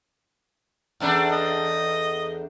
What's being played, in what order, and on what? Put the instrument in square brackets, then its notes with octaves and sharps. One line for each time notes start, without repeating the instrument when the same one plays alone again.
[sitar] E2 A3 D4
[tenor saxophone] D#5